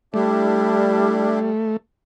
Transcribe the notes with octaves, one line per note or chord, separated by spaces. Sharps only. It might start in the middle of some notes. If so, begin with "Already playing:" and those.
G3 A3 D4 E4 G4